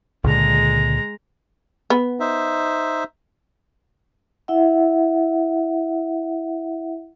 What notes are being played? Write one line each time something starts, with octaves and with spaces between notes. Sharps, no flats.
C#2 A#2 D3 G#3 A#5
B3
D#4 C5 E5
E4 E5 F#5